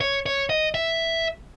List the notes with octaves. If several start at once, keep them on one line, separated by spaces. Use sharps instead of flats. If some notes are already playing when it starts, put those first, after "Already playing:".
C#5
C#5
D#5
E5